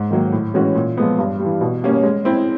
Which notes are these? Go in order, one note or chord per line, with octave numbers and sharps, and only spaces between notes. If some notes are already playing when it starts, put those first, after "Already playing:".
Already playing: G#2
D#3 F#3 A#3
A2
E3 G#3 C#4 F#4
A#2
F3 G#3 B3
G2
G3
E3
B2
G3 A#3 C#4
G#3
C4 E4